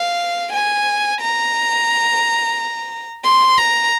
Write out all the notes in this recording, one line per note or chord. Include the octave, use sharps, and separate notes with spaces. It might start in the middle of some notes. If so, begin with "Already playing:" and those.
Already playing: F5
G#5
A#5
C6
A#5